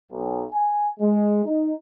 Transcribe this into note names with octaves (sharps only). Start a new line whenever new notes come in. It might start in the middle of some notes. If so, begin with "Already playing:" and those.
B1
G#5
G#3
D#4